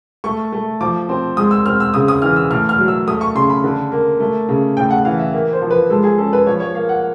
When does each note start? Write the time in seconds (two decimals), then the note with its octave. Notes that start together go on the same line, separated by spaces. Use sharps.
0.24 A3 C#6
0.52 A3
0.81 F3 D6
1.09 C4
1.37 G#3 D#6
1.51 E6
1.66 C4 F6
1.80 E6
1.94 C#3 D#6
2.08 D#6
2.22 E3 F6
2.36 E6
2.50 A2 F6
2.69 F6
2.79 F#3
2.88 E6
3.07 A3 D#6
3.21 C#6
3.35 C#3 C6
3.50 B5
3.64 D3
3.92 A#3
4.20 A3
4.49 C#3
4.77 A2 G5
4.91 F#5
5.05 E3 F5
5.19 E5
5.33 A#3
5.53 C5
5.62 F3
5.71 B4
5.90 G#3 A4
6.04 G#4
6.18 C#4 A4
6.33 B4
6.47 F3 C#5
6.60 C#5
6.74 A#3 F5
6.89 F#5